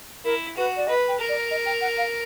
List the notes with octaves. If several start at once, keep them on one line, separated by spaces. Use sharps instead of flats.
E4 A#4
F#4 B4
D5
B4 D#5
G5
A#4
D5
D#5
G5
F#5
F5